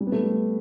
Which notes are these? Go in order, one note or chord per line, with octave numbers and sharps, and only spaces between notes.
G3
B3
A3
G3